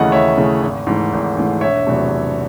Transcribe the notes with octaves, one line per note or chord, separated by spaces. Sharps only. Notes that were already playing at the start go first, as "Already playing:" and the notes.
Already playing: D#2 C#3 E3 A3 D#5 F#5
D#2 C#5 E5
C#3 E3 A3
G#1
G#2 E3 A3
G#1
G#2 E3 A3
E1 C#5 E5
E2 C3 F#3 A3
E1